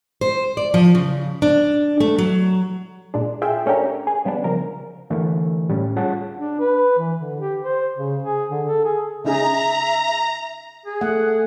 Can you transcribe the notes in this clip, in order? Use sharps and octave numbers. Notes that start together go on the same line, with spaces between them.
C5
D5
F3
C#3
D4
A3
F#3
A#2 G#3 D4
F4 G#4 E5 G5
A3 C#4 D4 G4 A#4
G#4
C#3 G3 B3 D4
C#3 F3 A#4
D3 E3 A3 A#4
A2 G3 C#4
F4 G#4 C#5 F#5 A5
D4
B4
E3
D3
G4
C5
C#3
G#4
D3
A4
G#4
C#3 D#4 G#4 E5 A#5
G#4
A3 F#5